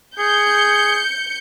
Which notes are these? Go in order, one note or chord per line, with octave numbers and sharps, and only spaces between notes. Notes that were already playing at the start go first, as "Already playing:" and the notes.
G#4 G6 C#7